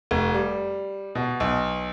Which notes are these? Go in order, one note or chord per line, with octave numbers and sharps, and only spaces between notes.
F1
G3
B2
B1